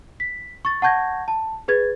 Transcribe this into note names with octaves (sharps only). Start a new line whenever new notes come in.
B6
C#6 A6
F#5 A5 C#6 G6 G#6 A#6
A5
G#4 B4 G#6 A6